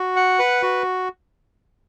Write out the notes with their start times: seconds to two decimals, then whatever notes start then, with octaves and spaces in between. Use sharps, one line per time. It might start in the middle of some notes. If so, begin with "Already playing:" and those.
Already playing: F#4
0.16 F#5
0.39 B4
0.63 F#4